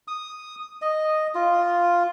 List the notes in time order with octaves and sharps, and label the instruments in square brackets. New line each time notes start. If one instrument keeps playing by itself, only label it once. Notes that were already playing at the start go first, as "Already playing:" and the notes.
[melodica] D#6
D#5
F4